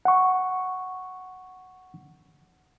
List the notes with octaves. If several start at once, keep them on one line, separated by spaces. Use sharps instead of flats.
F#5 C#6